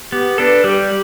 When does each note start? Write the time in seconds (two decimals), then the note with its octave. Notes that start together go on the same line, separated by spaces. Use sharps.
0.12 B3 G4
0.38 D4 A4 B4
0.64 G3 G4